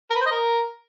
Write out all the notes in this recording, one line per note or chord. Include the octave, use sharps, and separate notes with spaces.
A#4
B4
C5
D#5
A#4